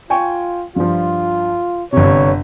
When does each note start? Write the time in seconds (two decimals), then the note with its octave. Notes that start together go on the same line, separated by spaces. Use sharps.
0.10 F4 G5 G#5 C#6
0.76 G2 F3 F4
1.92 G1 C3 C#5